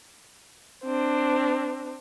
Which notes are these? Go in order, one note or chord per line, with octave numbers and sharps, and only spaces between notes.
C4 D4